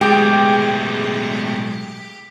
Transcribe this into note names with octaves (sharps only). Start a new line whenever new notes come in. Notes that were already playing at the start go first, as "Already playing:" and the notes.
B1 A2 G#3 G4 G#4 G5